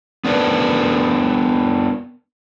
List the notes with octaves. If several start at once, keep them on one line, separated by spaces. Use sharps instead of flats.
B3 D4 A#4 B4